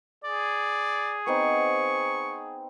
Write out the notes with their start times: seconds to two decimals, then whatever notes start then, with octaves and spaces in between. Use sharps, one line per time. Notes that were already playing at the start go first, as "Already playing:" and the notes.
0.24 G#4 D5
1.26 B3 C4 D#4 C#6